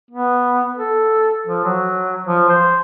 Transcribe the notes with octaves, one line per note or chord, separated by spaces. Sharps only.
B3
A4
F3
F#3
F3
C5